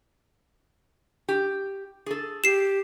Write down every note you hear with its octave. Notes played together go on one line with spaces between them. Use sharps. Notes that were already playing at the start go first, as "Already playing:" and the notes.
G4
G#4 A4
G4 C7 E7